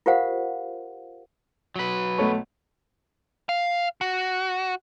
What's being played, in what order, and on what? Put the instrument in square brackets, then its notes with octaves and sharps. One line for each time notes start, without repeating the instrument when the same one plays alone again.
[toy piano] F4 G4 A#4 C5 F5 F#5
[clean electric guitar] F#3 B4
[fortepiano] B1 A3 C#5
[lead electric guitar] F5
F#4